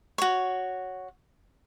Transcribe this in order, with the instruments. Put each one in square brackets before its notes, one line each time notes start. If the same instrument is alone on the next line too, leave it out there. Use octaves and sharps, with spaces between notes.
[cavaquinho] F#4 C#5